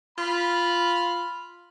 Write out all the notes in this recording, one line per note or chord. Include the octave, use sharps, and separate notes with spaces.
F4 B5